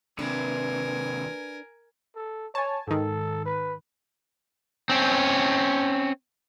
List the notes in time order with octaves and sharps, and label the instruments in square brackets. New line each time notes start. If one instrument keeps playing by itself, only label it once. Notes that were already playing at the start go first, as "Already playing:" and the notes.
[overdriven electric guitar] D#2 C3 [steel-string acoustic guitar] D4 B4 [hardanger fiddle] A#4 G#5
[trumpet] A4
[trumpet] C#5 [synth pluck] G#5 A5
[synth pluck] G#2 D#3 [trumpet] A4
[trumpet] B4
[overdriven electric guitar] C4 C#4